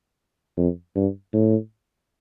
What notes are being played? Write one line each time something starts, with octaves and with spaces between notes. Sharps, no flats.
F2
G2
A2